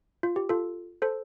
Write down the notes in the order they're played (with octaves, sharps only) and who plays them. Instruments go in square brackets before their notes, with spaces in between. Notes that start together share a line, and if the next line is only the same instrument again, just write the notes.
[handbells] F4
G4
F4 A4
A4 C5